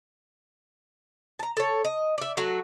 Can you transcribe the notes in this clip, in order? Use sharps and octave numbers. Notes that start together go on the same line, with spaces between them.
A5 A#5
A4 C#5
D#5
D5 E5
F#3 A3 F#4